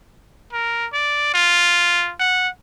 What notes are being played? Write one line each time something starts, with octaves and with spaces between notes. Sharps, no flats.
A#4
D5
F4
F#5